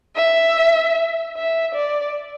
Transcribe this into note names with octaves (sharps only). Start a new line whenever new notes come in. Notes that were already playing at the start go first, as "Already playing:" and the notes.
E5
E5
D5